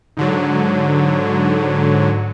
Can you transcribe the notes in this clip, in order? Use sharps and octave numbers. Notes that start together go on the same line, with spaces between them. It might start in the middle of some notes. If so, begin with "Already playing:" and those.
G#2 D3 F#3